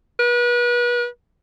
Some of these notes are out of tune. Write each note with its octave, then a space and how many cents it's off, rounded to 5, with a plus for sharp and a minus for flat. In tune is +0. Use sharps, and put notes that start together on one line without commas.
B4 -35